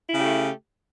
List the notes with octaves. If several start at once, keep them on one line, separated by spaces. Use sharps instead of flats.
C#3 A3 E4 G4